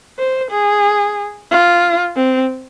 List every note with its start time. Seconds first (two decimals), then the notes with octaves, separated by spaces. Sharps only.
0.18 C5
0.52 G#4
1.51 F4
2.16 C4